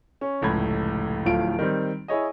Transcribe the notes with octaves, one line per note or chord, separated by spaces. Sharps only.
C#4
F1 C#2 A2 B5 G#6
D1 A2 F3 F4 D7
D#3 G3 C4
E4 G#4 C#5 D#5